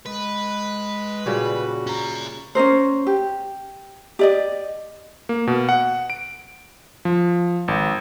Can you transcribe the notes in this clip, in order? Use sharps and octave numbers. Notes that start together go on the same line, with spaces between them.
G#3 B4
A#2 C#3 G3 F#4
C#4 A#5
C#4 D#4 A#4 C5
G4
G4 D5 D#5
A#3
B2
F#5
D7
F3
G#1